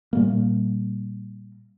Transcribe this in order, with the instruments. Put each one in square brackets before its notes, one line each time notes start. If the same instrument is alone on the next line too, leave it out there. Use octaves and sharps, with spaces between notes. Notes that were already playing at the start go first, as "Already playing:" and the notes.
[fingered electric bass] A#2 G3 A#3